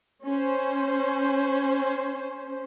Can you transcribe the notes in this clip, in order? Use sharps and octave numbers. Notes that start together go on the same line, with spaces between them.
C#4 C5